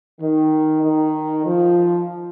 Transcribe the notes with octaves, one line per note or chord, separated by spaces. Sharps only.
D#3
D#3
F3